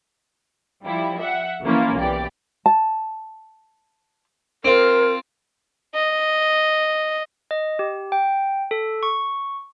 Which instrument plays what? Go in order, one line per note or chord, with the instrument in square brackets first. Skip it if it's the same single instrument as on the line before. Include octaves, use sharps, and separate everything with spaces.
[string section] F3 G3 E4
E5 F#5
E3 F3 A#3 C#4 E4 F4
B1 E3 G4 D5
[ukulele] A5
[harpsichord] C4 F4 [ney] A#4
[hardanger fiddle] D#5
[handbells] D#5
G4
G5
A4
C#6